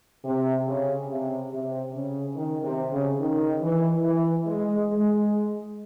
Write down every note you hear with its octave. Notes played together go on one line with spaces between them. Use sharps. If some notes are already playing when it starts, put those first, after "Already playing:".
C3
C#3
C3
C3
C#3
D#3
C3
C#3
D#3
E3
E3
G#3
G#3